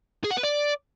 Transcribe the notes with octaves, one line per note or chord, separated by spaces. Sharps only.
G#4
F#5
B4
D5